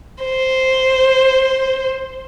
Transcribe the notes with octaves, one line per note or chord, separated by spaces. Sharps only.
C5